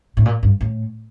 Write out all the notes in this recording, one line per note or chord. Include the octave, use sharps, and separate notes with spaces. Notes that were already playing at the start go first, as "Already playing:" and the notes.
A2
A#2
G2
A2